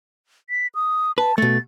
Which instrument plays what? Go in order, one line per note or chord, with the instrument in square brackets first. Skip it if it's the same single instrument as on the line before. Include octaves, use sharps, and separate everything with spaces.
[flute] B6
D#6
[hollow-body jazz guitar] B4 [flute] A5
[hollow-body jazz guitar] B2 A3 [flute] A6